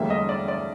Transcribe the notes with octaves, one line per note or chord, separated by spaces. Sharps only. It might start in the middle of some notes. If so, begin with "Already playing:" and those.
Already playing: E1 D2 D3 G3 A#3 E5
D#5
D5
D5